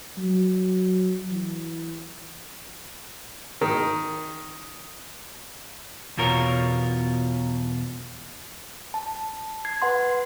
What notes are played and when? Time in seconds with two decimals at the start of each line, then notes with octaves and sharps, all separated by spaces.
0.18 F#3
1.31 E3
3.61 D#3
6.17 E2 B2 F4 A#4 C#5
8.94 A5
9.65 G#6 C7
9.82 B4 F#5 C6